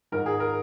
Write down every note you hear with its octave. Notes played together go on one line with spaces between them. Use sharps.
G#2 D#3 A#4
G#4
A#4